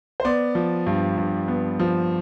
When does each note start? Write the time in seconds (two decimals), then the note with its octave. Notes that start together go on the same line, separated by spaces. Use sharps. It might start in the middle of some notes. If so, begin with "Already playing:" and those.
0.20 C5
0.25 B3 D5
0.55 F3
0.87 G2
1.18 G2
1.48 B3
1.80 F3